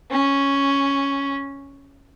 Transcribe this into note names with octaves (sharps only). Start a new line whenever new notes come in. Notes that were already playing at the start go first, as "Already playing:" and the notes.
C#4